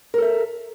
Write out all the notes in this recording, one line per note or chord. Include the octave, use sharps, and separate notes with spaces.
A4 A#4 E5